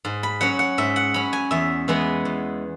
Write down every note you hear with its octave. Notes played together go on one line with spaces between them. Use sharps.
G#2
B5
F#3 C#4 F#5
F#5
G#2 E5
F#5
F#3 C#4 B5
G#5
E2 E5
E3 G#3 B3
E2